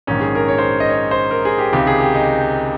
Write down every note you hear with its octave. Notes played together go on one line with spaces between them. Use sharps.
A#1 G#2 D#3 C#4
G#4
A#4
C#5
C5
D#5
C#5
C5
A#4
G#4
G4
C#2 C3 D#3 G4
G#4
G4
D#4